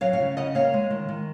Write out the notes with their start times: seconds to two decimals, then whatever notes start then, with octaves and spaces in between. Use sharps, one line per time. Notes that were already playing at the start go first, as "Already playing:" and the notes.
0.01 F#3 C#5 F5
0.13 C#5 F5
0.20 C#3
0.37 C#3 D#5 F#5
0.55 A#3 C#5 F5
0.74 G#3
0.90 D#3
1.08 D#3